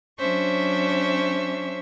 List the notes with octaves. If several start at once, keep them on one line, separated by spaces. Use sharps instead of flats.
F#3 C#4 D4 C5 E5 C#6